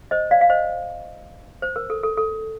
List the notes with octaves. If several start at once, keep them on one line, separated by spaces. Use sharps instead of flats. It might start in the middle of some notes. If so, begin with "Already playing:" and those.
C5 D#5
D5 F5
F5
C5 D#5
C5
A#4
A4
A4
A4